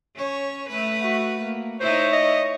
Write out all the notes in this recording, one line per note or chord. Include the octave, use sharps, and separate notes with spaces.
C#4 C#5
A3 B4
F#4
A#3
D#4 E4 C5 C#5
D#5